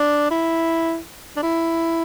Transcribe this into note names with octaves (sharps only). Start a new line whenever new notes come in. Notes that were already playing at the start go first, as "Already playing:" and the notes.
Already playing: D4
E4
D4
E4